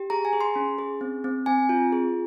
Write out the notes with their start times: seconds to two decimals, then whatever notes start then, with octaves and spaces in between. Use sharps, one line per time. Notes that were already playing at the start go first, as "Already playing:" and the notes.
Already playing: G4
0.10 G#4 A#5
0.25 G#5
0.33 G#4
0.41 C6
0.56 C#4
0.78 G#4
1.01 C4
1.24 C4
1.46 C4 G#5
1.69 F4
1.93 G#4